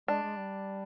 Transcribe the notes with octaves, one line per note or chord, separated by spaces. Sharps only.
G#3 D4
G#3
G3